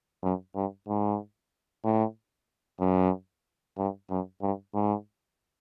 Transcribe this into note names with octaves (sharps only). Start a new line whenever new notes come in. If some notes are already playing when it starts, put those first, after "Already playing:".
F#2
G2
G#2
A2
F#2
G2
F#2
G2
G#2